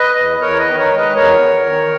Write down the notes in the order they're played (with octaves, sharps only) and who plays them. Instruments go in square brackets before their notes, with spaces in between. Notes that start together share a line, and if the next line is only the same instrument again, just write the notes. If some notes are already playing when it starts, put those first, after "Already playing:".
Already playing: [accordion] B4 D#5
E2
E2 A#4 C#5
B4 D#5
D#3
A#4 C#5
G#3
B4 D#5
E2 A#4 C#5
E2
D#3